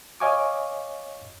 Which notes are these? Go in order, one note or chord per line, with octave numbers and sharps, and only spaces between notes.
C#5 D#5 F5 G#5 C#6 D6